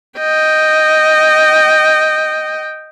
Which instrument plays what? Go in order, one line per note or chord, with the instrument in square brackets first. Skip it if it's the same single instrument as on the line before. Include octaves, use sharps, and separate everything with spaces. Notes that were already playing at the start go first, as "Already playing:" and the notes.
[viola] D#5 G5